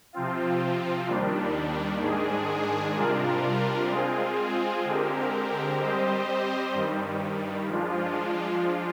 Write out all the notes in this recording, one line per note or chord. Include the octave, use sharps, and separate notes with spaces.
C3 F3 C4 F4
D#2 D#3 G3 D4
G#2 D#3 G#3 D4 G#4
C3 G3 D4 F4 A#4
G#3 C4 F4 G#4
D3 G#3 C4 G4 A#4
G3 C4 G4 C5 D#5
G2 D#3 G3
F3 G#3 D4 F4